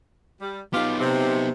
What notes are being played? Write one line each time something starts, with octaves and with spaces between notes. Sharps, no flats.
G3
B3 D#4 F4 G4
C3